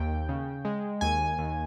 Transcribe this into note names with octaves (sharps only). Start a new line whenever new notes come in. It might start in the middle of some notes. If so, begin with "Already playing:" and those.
Already playing: D#2 G5
C#3
G#3
D#2 G#5
D#2